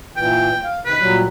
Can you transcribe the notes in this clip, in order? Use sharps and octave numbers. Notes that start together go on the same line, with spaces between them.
A#2 E3 G5
F5
C3 D#3 B4
A#2 F#3 G3